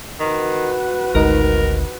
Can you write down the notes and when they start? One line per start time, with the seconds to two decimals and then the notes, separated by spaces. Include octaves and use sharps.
0.20 D#3 F#4 B4
1.15 G#1 D2 G#2 D#4 A#4